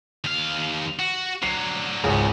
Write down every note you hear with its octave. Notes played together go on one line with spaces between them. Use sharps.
D#2 F5
F#4
D3 F#3 C7
G#1 C#2 C#3 B3 G#4